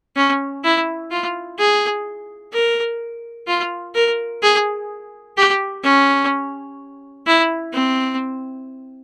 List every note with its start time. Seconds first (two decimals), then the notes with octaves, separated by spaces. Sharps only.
0.16 C#4
0.64 E4
1.11 F4
1.59 G#4
2.53 A#4
3.47 F4
3.95 A#4
4.42 G#4
5.37 G4
5.83 C#4
7.26 E4
7.73 C4